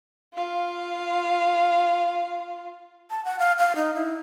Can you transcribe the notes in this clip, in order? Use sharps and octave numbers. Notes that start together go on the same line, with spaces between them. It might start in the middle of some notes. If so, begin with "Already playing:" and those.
F4 F5
A5
F#5
F5
F5
D#4
E4